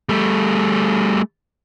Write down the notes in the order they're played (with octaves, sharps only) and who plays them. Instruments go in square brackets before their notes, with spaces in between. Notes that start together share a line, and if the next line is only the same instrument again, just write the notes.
[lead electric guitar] G3 A3